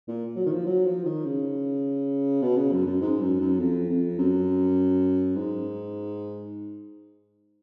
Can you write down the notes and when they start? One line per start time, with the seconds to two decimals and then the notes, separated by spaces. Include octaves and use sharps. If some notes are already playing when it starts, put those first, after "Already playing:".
0.08 A#2
0.36 F#3
0.46 D#3
0.52 F3
0.66 F#3
0.86 F3
1.05 D#3
1.25 C#3
2.42 B2
2.57 C#3
2.72 F#2
2.86 F#2
3.01 G#2
3.21 F#2
3.40 F#2
3.59 F2
3.89 F2
4.18 F#2
5.36 G#2